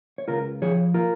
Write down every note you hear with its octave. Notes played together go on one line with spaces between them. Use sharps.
C#5
C#2 F4 A#4
F3 G#4 C#5
F4 A#4